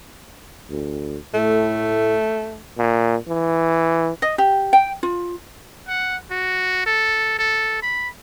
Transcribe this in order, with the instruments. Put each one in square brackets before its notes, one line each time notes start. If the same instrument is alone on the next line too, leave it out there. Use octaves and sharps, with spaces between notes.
[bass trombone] D2
[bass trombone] A2 [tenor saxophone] A3
[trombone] A#2
E3
[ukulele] D#5
G4
G5
F4
[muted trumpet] F#5
F#4
A4
A4
B5